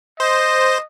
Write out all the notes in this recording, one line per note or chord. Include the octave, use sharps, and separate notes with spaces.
C5 D#5